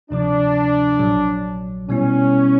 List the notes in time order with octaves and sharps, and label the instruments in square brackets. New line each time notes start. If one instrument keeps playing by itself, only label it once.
[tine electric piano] D2 C3 F3 [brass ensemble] D4
[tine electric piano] A#1 A#2 F#3
[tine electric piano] B2 G3 B3 E4 [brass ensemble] C#4